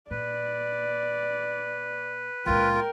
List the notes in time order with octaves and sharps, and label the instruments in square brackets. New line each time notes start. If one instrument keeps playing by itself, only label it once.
[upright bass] A#2 [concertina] B4 [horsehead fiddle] D5
[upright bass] C#2 A#2 [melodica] F4 [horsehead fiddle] A#4 G5